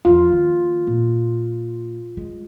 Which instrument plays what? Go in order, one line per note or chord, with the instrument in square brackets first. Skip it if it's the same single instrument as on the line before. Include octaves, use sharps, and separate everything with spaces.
[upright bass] E2 F3 [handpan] F4
[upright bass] D#3 A#3
A#2
G#3